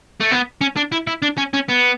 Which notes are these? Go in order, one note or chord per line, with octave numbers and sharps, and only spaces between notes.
A3
B3
C#4
D4
E4
E4
D4
C#4
C#4
B3